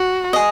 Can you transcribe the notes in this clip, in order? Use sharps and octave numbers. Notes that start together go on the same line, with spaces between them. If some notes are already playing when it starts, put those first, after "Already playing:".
Already playing: F#4
G#4 D#5